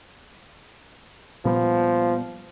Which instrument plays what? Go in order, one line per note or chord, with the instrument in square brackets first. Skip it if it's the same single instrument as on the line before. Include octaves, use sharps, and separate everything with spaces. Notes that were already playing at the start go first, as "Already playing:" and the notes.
[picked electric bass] A#2 G3 B3 [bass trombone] F3